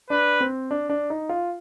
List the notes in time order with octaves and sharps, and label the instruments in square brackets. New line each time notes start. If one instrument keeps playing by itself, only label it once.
[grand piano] D4 [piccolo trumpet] B4
[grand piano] C4
D4
D4
D#4
F4